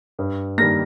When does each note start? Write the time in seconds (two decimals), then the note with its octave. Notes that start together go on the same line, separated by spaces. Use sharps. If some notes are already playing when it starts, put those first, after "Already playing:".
0.19 G2
0.58 D#3 G3 A#3 A#6